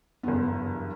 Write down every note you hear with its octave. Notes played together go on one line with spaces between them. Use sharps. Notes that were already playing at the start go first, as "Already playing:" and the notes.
F#1 E2 G2 B3